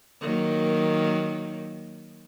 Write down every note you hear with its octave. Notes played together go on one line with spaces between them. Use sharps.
D#3 F#3 A#3